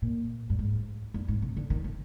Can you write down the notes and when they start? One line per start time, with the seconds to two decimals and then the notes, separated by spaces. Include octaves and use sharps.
0.02 A#2
0.50 G2
0.59 G#2
1.14 G2
1.28 G#2
1.42 C3
1.57 D3
1.70 D#3
1.84 F3